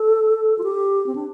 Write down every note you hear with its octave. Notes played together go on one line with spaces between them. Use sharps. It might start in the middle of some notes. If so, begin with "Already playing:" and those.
Already playing: A4
F4
G4
C4
D4